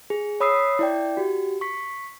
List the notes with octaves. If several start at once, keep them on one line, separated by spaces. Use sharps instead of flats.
G#4
C#5 B5 D#6 E6 B6 C7
E4 D5 G5
F#4 G4
C#6 B6